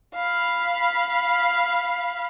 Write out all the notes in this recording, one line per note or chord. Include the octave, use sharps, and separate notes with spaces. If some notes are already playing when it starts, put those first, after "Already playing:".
F5 B5